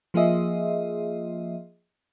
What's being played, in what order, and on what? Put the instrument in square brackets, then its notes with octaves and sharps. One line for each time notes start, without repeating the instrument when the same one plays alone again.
[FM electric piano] F3 A#3 F4 G#4 D#5 E5